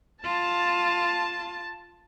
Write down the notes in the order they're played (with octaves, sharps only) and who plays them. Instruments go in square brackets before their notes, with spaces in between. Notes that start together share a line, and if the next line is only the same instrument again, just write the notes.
[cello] F4 [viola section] A5